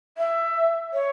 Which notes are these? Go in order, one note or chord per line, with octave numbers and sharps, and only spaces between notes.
E5
C#5